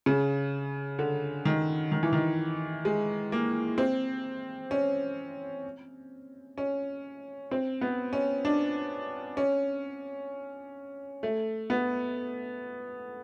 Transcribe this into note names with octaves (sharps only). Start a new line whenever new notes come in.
C#3
D3
D#3
D#3
E3
D#3
G#3
A#3
C4
C#4
C#4
C4
B3
C#4
D4
C#4
A3
B3